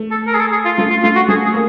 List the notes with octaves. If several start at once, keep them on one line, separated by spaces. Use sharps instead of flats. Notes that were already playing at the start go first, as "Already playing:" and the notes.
Already playing: A3
A4
A#4
G#4
A4
G#4
F4
A3 F4
F4
A3 F4
F#4
A3 G#4
G#4
A#3